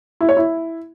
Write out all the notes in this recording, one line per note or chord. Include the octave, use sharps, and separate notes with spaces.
E4
C#5
E4